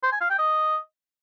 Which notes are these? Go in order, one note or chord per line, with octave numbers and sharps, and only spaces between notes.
C5
G#5
F5
G5
D#5